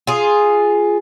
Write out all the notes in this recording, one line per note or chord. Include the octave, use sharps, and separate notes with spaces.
F4 G#4